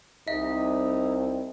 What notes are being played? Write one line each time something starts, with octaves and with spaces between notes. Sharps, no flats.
C2 D#4 D#5 E5